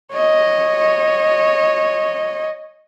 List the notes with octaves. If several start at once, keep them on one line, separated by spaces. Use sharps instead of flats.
C#5 D#5